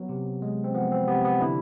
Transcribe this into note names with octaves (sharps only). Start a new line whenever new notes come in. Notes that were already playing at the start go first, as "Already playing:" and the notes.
Already playing: F#3 B3
C3
G#3
C4
F3 B3
C4
C3 B3
B3
D3 D4 E4